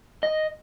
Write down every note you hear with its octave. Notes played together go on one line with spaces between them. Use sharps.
D#5